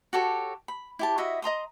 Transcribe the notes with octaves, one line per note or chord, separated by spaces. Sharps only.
F#4 G4 A4 C#5
B5
E4 G4 A5
E4 F#4 D#5 E5
D#5 A#5 C6 D#6